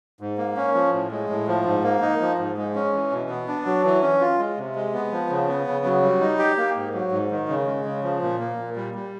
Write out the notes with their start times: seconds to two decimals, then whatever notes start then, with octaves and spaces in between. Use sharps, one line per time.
0.20 G#2
0.38 A#3
0.56 C#4
0.74 F3
0.93 A2
1.11 G#3
1.30 A2
1.47 F3
1.65 G#2
1.84 A#3
2.02 D#4
2.21 F3
2.38 G#2
2.57 G#3
2.75 C#4
2.93 E3
3.12 B2
3.29 B3
3.48 D4
3.66 F#3
3.85 E3
4.02 C#4
4.21 F4
4.39 G#3
4.57 C3
4.75 G#3
4.94 B3
5.12 F3
5.30 C#3
5.48 B3
5.67 C#3
5.85 F#3
6.02 G3
6.21 D#4
6.39 G4
6.57 A#3
6.76 G#2
6.94 F#3
7.12 G#2
7.31 D#3
7.48 C#3
7.67 G#3
7.85 C#3
8.03 F3
8.22 A#2
8.39 A#3
8.59 A#2
8.76 G3
8.94 G3